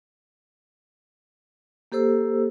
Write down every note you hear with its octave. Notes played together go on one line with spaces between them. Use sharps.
A#3 G4 A4 C5 E6